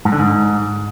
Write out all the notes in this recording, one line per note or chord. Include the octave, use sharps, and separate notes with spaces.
G#2
D3
G#2